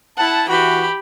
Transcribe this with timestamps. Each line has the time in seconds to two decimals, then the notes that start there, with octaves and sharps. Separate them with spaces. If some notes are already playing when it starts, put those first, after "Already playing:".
0.17 E4 F#5 A5
0.48 E3 F#4 G4 B5